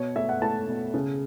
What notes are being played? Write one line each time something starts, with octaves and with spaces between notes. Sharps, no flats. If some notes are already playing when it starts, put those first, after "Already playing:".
Already playing: B2 C#5
A3 E5
F#5
A3 A5
B2
C#3